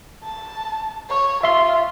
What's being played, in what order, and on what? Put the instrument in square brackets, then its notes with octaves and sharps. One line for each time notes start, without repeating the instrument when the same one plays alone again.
[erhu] A5
C#5
[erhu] F4 [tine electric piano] E5 F5 C6